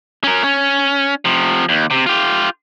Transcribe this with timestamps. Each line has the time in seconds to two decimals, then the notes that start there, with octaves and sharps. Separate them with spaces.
0.24 C#4 A#4
0.44 C#4
1.25 C3 F3
1.69 D#2
1.91 C3
2.06 F4 G4